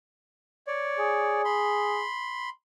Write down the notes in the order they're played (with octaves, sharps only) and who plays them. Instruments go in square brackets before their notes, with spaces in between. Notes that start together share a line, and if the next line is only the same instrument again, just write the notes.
[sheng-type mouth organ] C#5 D5
[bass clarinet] G#4
[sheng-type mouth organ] B5 C6